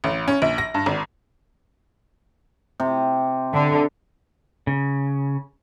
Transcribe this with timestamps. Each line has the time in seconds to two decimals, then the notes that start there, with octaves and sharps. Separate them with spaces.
0.04 A1
0.28 C#4
0.42 A#1
0.58 A#6
0.74 G2
0.86 G#1
2.80 C3
3.54 D3
4.67 C#3